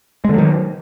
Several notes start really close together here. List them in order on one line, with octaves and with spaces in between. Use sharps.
G#3 D3 F#3 D#3